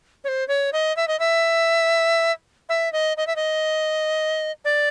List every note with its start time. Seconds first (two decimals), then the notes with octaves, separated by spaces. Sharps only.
0.24 C#5
0.28 C5
0.48 C#5
0.73 D#5
0.96 E5
1.08 D#5
1.19 E5
2.69 E5
2.93 D#5
3.17 D#5
3.27 E5
3.36 D#5
4.65 D5